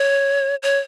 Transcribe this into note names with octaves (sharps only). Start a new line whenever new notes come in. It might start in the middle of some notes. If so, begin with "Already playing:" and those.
Already playing: C#5
C#5